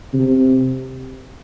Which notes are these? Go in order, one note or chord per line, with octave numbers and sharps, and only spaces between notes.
C3